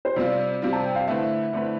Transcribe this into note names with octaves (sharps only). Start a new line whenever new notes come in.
C5
C3 G3 C4 F4 D5
C3 G3 C4 F4
A5
G5
F5
D3 A3 C4 E4 B4 E5
D3 A3 C4 E4 B4